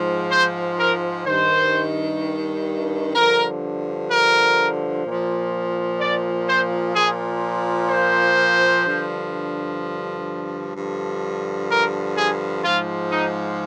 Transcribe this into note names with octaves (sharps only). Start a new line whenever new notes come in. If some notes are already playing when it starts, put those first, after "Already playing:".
Already playing: G#2 F3
C5
A#4
G2 D#3 C5
G2 D3 F3 A#4
A#4
A#2 F3
D5
C5
A#2 F3 G#4
C5
G2 D3 F3
G2 D3 F3
A#4
G#4
G#2 F3 F4
D#4